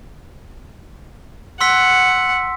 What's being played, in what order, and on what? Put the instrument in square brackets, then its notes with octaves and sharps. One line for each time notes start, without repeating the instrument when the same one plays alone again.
[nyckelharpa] F#5 [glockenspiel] C6 E6 B6